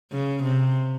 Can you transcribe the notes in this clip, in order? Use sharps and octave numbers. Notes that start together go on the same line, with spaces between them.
C#3
C3